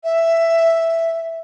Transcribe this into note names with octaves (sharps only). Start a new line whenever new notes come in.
E5